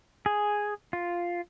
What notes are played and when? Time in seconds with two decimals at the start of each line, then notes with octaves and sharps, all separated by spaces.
0.26 G#4
0.93 F4